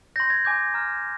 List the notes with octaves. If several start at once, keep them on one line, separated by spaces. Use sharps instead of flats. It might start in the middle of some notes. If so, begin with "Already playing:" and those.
C6 G6 A#6
G#6
G#5 D6 G6
A#5 F6